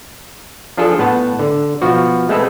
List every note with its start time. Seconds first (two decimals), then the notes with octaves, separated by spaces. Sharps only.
0.77 F3 D4 F4 G#4 A4
0.98 A2 B3 F#5 A5
1.39 D3
1.82 B2 F3 F#4
2.29 G#3 A3 C4 A4 B4